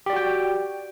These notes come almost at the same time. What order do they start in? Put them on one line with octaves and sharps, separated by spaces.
G4 D5 F#4 G5